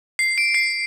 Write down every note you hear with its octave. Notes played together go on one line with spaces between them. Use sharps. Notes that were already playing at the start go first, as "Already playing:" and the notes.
C7
D7
C7